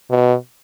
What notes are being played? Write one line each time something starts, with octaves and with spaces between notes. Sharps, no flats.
B2